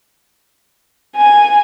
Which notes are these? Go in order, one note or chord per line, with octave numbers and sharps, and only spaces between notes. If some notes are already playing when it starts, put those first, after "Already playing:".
G#5